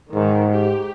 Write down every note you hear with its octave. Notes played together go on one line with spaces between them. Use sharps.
G#2 D#3
G4